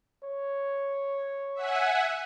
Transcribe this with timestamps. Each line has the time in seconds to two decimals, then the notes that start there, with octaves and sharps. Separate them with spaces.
0.23 C#5
1.54 E5 F#5 G#5